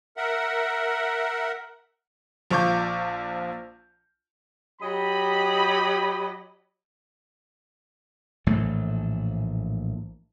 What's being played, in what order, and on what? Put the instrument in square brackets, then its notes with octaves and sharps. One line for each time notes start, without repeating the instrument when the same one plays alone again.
[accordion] A#4 E5 F#5
[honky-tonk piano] A#1 F3 F4 C#6 D6 G6
[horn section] F#3 G4 D#5 B5
[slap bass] A#1 A2 E3 A3